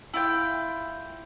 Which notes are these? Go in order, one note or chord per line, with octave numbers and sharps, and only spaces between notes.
E4 F4 G5